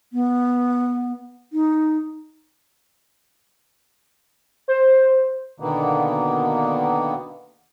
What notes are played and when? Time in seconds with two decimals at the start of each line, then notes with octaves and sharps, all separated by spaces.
0.13 B3
1.53 D#4
4.68 C5
5.60 B2 D3 D#3 A#3 B3